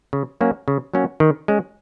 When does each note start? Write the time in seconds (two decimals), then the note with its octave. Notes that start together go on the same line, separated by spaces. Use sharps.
0.13 C#3
0.41 F#3 A#3 C#4 F#4
0.68 C#3
0.94 F#3 A#3 C#4 F#4
1.20 D#3
1.48 G#3 C#4